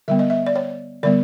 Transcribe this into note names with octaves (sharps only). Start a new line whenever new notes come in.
D3 G3 B3 E5
D#5
E5
D5
C#5
D3 G3 B3 D5